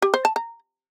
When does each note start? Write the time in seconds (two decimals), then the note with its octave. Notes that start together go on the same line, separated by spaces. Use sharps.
0.02 G4
0.14 C5
0.25 A5
0.36 A#5